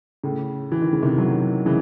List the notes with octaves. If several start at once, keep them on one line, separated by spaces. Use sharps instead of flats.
A2 C#3
E3
D#3
C#3
C3 D#3
D#3 F#3
C#3 E3